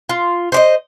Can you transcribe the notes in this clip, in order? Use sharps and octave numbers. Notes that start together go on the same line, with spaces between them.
F4
C5 D5 D#5